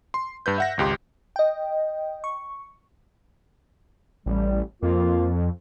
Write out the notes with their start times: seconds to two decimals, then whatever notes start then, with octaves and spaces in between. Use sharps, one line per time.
0.14 C6
0.46 G2 B4 G6
0.58 E5 F#5 A#6
0.77 G#1 C#2 G4 C6
1.36 D#5 G5
2.24 C#6
4.26 A1 G3
4.83 F2 A#3 F4